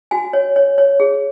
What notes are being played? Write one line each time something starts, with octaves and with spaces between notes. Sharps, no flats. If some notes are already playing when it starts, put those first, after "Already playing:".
F#4 G#5
C#5
C#5
C#5
G#4